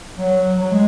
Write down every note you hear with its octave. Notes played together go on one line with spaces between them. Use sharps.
F#3
F#3
G#3